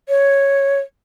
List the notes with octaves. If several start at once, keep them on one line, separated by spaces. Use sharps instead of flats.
C#5